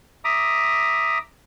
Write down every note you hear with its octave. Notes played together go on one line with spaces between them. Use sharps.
E5 A#5 D6 D#6